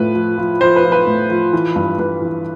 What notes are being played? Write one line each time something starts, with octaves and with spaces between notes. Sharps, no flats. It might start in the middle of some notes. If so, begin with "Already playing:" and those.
Already playing: A2 F3 B4
F3
F3
F3 C5
B4
F3
B4
A2
F3
E3
G2
G2 B4
E3